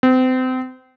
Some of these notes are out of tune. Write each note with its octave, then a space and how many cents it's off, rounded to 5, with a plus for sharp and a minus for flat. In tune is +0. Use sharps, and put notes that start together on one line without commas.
C4 -30